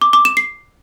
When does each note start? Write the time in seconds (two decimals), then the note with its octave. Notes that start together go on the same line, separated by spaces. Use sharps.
0.02 D6
0.13 D6
0.25 E7
0.37 C7